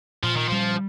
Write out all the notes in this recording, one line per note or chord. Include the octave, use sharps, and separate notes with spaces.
A#2 F3
D#3
F3 G3